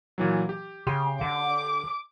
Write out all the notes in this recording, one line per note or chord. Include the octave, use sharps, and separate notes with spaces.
A#2 E3 F#3
G4
C#3 G4 G5 C6
D3 D6